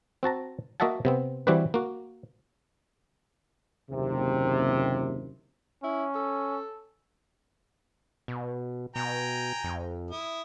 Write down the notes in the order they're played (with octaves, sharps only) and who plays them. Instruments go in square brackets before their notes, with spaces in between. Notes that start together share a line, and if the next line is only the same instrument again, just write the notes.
[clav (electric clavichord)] C4 F#4 A5 A#5
A#3 F#4 D#5 E5 F#5 A5
C3 B3 C4
E3 G3 C4 F#4 G4 B4
A#3 F#4
[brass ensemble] F#1 D#2 C3
[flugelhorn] C#4 [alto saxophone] E4
[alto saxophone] A4
[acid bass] B2
[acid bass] B2 [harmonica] G5 G#5 A#5
[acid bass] F2
[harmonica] E4 D#6